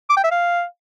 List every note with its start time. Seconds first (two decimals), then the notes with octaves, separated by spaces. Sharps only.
0.10 D6
0.17 G5
0.24 E5
0.31 F5